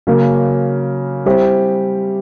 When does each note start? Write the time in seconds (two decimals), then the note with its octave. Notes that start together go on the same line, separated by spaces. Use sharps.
0.07 C#3 F#3 A#3 C#4
1.26 G3 C4 E4 G4 C5